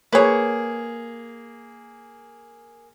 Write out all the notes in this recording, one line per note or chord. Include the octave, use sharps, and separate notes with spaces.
A#3 G#4 B4 C#5